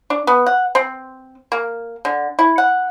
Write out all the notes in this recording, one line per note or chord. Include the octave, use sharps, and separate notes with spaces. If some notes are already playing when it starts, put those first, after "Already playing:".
D4
B3
F#5
C4
A#3
D3
E4
F#5